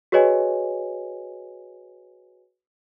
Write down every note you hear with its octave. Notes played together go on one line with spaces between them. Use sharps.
F#4 G#4 B4 C#5 D#5 G#5